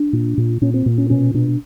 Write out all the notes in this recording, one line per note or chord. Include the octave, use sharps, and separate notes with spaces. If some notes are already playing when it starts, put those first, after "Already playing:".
Already playing: D4
A#2
A#2
A#2 C#4
C4
A#2
C#4
B2 C#4
B2 D4